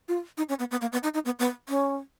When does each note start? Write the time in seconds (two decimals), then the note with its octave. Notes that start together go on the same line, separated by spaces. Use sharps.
0.08 F4
0.38 D#4
0.49 C#4
0.59 B3
0.71 B3
0.81 A#3
0.92 B3
1.03 D#4
1.14 D#4
1.25 B3
1.39 B3
1.69 C#4